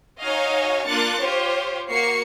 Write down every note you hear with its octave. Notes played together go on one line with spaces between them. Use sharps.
D#4 F#4 C#5 D#5 F5 G#5
A#3 D4 F4 F#6 A6 C#7
F4 G4 C5 C#5
A#3 F#4 C#6 C7 C#7